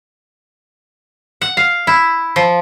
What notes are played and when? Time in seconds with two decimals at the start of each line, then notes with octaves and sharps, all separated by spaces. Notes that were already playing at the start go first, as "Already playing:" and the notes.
1.41 F#5
1.57 F5
1.87 E4
2.36 F3